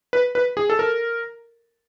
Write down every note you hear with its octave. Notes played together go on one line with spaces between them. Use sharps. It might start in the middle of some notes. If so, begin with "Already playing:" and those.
B4
B4
G#4
A4
A#4